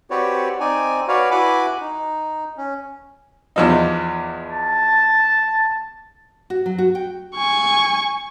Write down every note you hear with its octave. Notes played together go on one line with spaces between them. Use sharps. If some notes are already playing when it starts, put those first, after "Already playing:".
C4 F#4 G4 B4 C#5 D5
C4 D#4 D5 G#5
F#4 B4 C#5 D5 F5
E4 F#4 B4 G#5 B5 D6
D#4
C#4
E2 F3 D#4
A5
F#4
F#3
F#4
G5
G#5 C#6